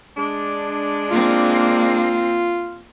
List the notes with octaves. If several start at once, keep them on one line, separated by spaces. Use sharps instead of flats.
G#3 D4
A#3 C4 F4